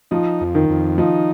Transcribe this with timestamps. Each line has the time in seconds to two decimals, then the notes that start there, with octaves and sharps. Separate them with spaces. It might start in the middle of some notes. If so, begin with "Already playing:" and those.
0.11 F3 D#4
0.41 F2
0.55 D#3
0.69 F2
0.98 F3 D#4